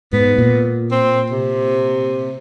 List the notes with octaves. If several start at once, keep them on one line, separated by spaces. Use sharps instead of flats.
G#2 B3
A#2
C4
C3